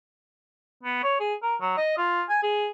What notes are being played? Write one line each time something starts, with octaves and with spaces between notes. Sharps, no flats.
B3
C#5
G#4
A#4
F#3
D#5
F4
G#5
G#4